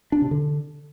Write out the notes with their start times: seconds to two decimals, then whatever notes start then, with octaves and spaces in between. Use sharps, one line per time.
0.12 D4
0.22 C3
0.31 D3